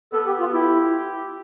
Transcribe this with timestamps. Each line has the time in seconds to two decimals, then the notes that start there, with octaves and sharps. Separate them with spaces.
0.13 B3 A4
0.26 G4
0.40 F4
0.53 E4 G4